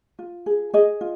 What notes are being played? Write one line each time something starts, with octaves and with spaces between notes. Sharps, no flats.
F4
G#4
G#4 D#5
F4